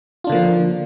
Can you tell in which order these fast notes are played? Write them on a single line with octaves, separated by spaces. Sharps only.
F4 D4 D3 A#3 F3